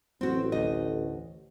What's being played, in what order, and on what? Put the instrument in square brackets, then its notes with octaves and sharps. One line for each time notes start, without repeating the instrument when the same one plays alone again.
[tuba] A1 [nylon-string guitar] C4 F#4
[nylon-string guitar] D2 D#5